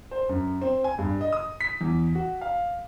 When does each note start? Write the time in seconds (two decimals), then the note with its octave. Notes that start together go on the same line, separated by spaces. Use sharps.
0.11 C5
0.29 F#2
0.62 C4
0.84 G#5
0.99 G2
1.21 D#5
1.33 D#6
1.61 B6
1.81 E2
2.15 F#4
2.41 F5